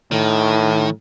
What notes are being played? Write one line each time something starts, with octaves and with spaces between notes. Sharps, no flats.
A2 D#3